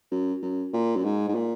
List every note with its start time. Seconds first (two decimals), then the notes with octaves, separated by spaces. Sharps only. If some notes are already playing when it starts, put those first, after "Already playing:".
0.11 F#2
0.42 F#2
0.73 A#2
0.96 F#2
1.04 G#2
1.28 G#2
1.34 A#2